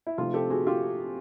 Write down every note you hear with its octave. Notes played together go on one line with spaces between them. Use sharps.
E4
C3 F3 A3 C4 D#4 F4
G4 A4
F#4 G#4
F4 G4